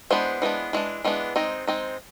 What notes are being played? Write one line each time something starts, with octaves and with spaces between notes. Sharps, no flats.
E3 G#3 B3 D4 C5
E3 G#3 B3 D4
E3 G#3 D4
E3 G#3 B3 D4
G#3 C4 D#4
G#3 C4 D#4